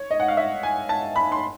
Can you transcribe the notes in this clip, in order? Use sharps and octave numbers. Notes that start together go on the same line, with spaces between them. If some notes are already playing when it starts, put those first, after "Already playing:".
Already playing: C#5
D#5
F#5
F5
E5
G#5
A5
B5
C6